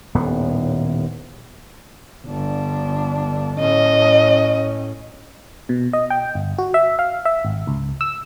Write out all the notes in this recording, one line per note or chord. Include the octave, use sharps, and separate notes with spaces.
D#1 D#2 A2 B3
G1 D4
A2 C#4 D#5
B2
D#5
G5
G1
F#4
E5
F5
E5
G#1
C#2
E6